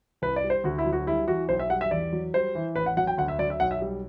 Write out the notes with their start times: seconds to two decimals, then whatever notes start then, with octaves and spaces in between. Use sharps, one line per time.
0.22 C2 B4
0.36 D5
0.44 G3
0.50 C5
0.64 D2 F#4
0.78 E4
0.86 F#3
0.93 F#4
1.07 G3 E4
1.27 E3 F#4
1.49 B1 C5
1.59 E5
1.70 G3 F#5
1.81 E5
1.91 E2 D5
2.13 F#3
2.34 G3 C5
2.55 E3
2.76 A1 B4
2.86 F#5
2.97 F#3 F#5
3.07 G5
3.17 D2 F#5
3.28 E5
3.39 F#3 D5
3.50 E5
3.60 B1 F#5
3.71 E5
3.81 G3